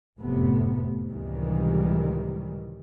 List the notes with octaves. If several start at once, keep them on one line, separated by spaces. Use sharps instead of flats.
F1 F#2 A2 C3 A3 B3
C#2 A2 C3 D#3 E3 G3